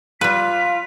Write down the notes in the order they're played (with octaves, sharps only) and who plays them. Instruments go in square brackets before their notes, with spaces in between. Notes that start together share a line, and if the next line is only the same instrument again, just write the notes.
[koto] G3 B4 [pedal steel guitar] F4 [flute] B6